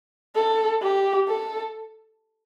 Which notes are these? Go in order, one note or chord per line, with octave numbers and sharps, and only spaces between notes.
A4
G4
A4